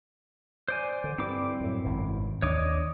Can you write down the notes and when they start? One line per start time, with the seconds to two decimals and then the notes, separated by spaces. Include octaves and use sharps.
0.68 C5 D5 G#5
1.04 D3
1.18 G2 C4 E4 D6
1.60 F#2 A2
1.84 G#1 F#2 B2
2.42 D#2 D4 C#5 D#5 D6